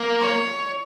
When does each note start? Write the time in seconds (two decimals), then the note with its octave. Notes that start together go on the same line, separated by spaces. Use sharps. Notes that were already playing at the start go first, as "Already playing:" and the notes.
Already playing: A#3
0.21 C#5